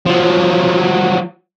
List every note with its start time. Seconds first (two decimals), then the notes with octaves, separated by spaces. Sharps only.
0.06 F3 F#3